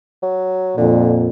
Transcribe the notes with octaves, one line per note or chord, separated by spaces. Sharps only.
F#3
F2 A#2 D3